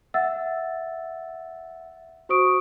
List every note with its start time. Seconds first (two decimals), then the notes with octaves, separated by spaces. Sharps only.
0.14 E5 F#5 E6 A6
2.29 F#4 C5 C#6 D#6 D7